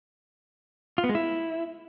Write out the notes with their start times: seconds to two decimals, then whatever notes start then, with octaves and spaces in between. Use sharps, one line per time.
0.98 F4
1.04 B3
1.09 G#3
1.15 E4